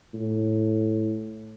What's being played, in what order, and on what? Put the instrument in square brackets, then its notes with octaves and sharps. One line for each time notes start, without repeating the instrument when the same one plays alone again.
[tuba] A2